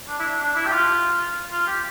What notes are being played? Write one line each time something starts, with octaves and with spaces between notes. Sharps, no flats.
D4
E4
D4
D4
E4
G4
F4
F4
G4